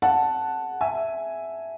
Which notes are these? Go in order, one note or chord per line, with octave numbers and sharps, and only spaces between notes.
F#5 A5
E5 G#5